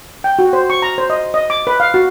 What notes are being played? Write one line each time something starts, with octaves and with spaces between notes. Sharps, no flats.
G5
F#4
C5
C#6
A#5
C5
D#5
D#5
D6
B4
F5
F#4